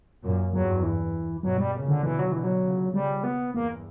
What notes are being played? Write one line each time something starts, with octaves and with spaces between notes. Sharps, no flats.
F#2 A#2
E2 G2 F#3
E3
G2 B2 F#3
G3
A#2 C#3
D3
B2 D3 E3
F#3
B2 D3 E3
F#3
A#2 C#3
A#2 C#3 G3
B3
E2 G2 A#3